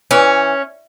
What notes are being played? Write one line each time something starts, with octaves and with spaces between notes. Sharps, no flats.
E3 C#4